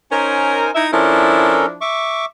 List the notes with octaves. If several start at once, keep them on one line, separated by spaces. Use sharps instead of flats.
C#4 D#4 A#4 C5 G#5
D#4 E4 E5
F3 C#4 D4 E4 A4 A#4
E5 C#6 D6